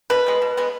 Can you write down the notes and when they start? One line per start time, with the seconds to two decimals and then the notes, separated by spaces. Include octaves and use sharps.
0.10 B2 B4
0.26 G#3 B3
0.42 B2
0.57 G#3 B3